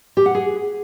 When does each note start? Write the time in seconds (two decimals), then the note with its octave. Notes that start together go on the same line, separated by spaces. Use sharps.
0.17 G4
0.26 F#5
0.35 G#4